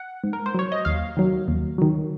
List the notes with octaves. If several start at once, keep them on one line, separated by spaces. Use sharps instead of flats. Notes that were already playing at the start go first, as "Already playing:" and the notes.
Already playing: F#5
G#2
A#4
C5
F#3 C#5
D#5
D#2 F5
D#3 F#3
D#2
D#3 F#3